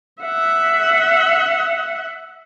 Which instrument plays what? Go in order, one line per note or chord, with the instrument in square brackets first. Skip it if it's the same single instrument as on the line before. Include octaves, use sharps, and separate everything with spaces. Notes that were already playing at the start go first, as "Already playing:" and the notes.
[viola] E5 F#5